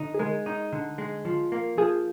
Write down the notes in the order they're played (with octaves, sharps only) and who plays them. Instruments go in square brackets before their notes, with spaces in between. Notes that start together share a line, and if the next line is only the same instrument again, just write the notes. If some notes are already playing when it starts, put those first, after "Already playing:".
Already playing: [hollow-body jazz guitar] D3 D#4
[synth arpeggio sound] G#4
[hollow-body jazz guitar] G#3 [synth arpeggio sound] A#4
[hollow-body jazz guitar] D#4
D3
G#3
F3
A#3
[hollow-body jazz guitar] F3 [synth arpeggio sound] G#4